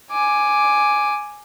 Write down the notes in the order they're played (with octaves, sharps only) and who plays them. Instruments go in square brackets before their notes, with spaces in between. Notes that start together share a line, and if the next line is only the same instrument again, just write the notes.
[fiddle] G#5 D6